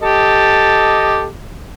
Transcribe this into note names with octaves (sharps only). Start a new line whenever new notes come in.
G4 A4 D#5